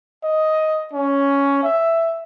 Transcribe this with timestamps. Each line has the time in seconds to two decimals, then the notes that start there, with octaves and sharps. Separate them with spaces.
0.23 D#5
0.93 C#4
1.63 E5